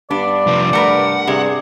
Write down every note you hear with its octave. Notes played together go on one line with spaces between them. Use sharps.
G2 B3 D4 D5
C3 F3
A3 A#4 B4 F#5
G2 C3 G#4